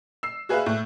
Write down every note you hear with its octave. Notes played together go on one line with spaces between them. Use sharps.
E6 C7
F#4 G#4 B4 E5 F5 F#6
A2